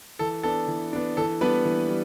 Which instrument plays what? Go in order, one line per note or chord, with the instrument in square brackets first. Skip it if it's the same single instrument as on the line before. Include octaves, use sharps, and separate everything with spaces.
[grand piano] E3 A4
B3 D4 A4
E3
B3 D4
E3 A4
G3 B3 D4 B4
E3
G3